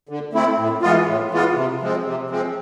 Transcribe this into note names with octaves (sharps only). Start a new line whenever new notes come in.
D3
A3 C4 E4
A2
E3 G#3 B3 F4
A2
E3 G#3 B3 F4
C3
F3 G#3 C4
C3
F3 G#3 C4